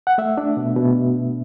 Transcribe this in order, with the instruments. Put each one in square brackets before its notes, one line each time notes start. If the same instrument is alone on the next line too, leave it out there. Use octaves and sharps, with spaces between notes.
[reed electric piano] F#5
A3 E5
D4
B2
B2